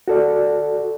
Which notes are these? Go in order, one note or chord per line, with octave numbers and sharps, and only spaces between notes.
F#4 A4 D5